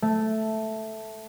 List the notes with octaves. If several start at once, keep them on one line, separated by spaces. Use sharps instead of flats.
A3